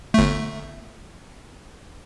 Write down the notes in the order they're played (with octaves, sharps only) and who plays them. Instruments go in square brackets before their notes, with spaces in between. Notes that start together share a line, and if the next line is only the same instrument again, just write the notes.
[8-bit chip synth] G1 A3